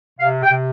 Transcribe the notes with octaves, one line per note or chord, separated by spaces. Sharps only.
C3 F5
G5
C3